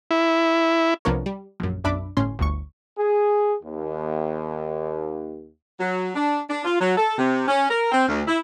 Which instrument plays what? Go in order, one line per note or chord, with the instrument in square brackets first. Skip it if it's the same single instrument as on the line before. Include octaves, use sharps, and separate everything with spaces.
[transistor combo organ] E4
[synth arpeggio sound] C2 F3 B3 D4 A#4 C#5
G3
A#1 F#2
B1 F#2 D4 E5 B5 D6
G1 A2 C#4 C6
G1 D2 C#6
[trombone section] G#4
D#2
[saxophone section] F#3
D4
D4
F4
F#3
A4
C3
C#4
A#4
C4
D2
E4